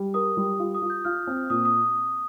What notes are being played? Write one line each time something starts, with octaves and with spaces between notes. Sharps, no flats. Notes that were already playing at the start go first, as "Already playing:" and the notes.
Already playing: G3
A#4 D#6
G3
F4
D#6
F4
G6
F4 F6
C4
A#2 D#6
D#6